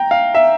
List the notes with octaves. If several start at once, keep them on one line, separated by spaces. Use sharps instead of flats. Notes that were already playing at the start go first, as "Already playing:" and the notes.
Already playing: G5 A#5
F5
E5